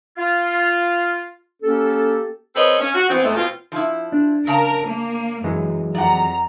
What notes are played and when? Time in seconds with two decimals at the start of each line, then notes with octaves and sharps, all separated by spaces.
0.18 F4
1.63 A#3 C#4 G4 A4
2.55 C4 A4 B4 C#5 D#5
2.79 C#4
2.94 F#4
3.09 E3 B3 C4
3.23 E2 E3 G#3 A3
3.35 B2 C4 F4
3.72 F3 E4
4.12 D4
4.47 C#3 A#4 A5
4.88 A#3
5.44 F#2 E3 F#3 G#3
5.95 F2 D5 F#5 A#5